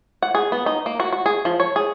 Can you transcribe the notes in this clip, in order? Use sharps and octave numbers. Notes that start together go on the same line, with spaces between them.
F#5
G#4
B3
D#4
A#3
F#4
F#4
G#4
F3
C#5
G#4